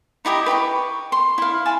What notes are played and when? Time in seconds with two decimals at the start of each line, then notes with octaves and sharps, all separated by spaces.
0.25 D#4 E4 G4 D#5
0.46 B4 G5 B5 C#6
1.12 C6
1.38 E4 F5
1.65 G#5 A5 B5